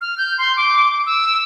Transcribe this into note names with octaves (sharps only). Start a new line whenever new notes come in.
F6
G6
C6
D6
E6